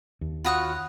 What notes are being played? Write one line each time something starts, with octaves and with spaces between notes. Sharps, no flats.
D#2
F4 F#4 C#5 B5 D#6 F#6